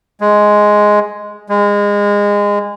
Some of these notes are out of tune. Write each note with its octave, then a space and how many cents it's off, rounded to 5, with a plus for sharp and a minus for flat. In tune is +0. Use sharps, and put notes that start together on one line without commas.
G#3 +5
G#3 -25